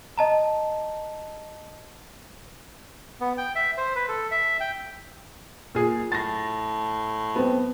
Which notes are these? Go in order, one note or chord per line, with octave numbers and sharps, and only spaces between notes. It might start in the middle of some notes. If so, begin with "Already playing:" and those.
D#5 A5 A#5
B3
G5
E5
C5
B4
A4
E5
G5
A#2 G#4
A2 A6 A#6
B3 C4